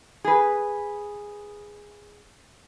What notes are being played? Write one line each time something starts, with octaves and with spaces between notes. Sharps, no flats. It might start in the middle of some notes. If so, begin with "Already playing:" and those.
G#4 B4